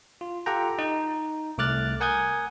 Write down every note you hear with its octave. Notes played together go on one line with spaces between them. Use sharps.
F4
F4 G4 A4 F#5 G5 A#5
D#4
C2 A3 D6 F6 F#6 A6
A#4 F#5 G#5 D#6 G6 G#6